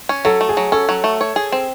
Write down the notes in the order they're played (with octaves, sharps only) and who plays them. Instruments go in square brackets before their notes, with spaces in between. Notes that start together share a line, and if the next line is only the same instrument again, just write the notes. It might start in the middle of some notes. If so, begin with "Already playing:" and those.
[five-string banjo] C#4
[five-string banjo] F#3 [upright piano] A4
[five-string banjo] A3
[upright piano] G#4
[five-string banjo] F#3
[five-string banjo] C#4 [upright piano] A4
[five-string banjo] F#3
A3
C#5
G#4
C4